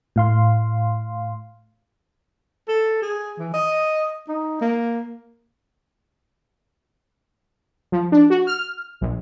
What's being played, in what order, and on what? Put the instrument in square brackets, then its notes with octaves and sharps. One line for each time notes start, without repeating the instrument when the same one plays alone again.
[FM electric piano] A2 F5 C6
[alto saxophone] A4
G#4
E3
D#5
D#4
A#3
[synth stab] F3
D4
F#4
F6
A#1